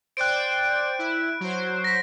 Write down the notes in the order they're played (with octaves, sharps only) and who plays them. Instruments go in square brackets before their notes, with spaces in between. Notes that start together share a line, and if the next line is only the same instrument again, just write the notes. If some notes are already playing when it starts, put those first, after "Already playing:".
[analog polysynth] C5 D5 G5 [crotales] F#6 D7
[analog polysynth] E4
F#3 C5
[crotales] A#6 B6